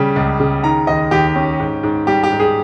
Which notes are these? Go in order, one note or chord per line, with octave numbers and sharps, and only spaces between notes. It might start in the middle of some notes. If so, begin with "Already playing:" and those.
Already playing: C#3 G3
C#2
C#3
D#3 A#5
D#2 D#5
D#2 G4
C#4
G#2
G#2
G3 G4
G4
G#2
G#4